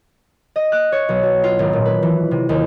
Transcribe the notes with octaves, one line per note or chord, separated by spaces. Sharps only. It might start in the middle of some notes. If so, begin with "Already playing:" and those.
D#5
F#6
C#5
B1
F#4
F4
G#1
A#2
B4
E3
C3
D#2